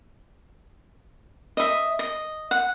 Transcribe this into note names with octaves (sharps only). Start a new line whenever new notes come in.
D#5 E5
D#5
F#5